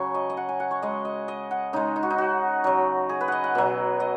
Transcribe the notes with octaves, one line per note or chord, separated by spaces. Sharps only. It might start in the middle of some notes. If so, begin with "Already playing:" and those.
Already playing: C#3 F#3 C#5
D#5
D#5
F#5
G#5
F#5
C#5
C#3 G#3 D#5
D#5
D#5
F#5
C#3 G#3 D#4
D#4
F#4
D#4
F#4
C#3 F#3
G#4
B4
D#5 F#5
F#5
B2 F#3
D#5